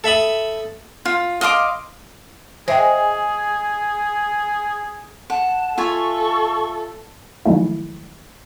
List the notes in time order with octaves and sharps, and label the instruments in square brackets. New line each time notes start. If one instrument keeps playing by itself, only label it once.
[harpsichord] A4 E5 B5 D#6
[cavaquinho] F4
D#5 F5 C6 D6
[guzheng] G#3 [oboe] G#4 [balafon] C5 E5 G5
[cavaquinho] F#5 [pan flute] A5
[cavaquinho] F4 E5 G#5 [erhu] A4 [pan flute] C#6
[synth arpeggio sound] D#3 F3 F#3 G#3 A3 E4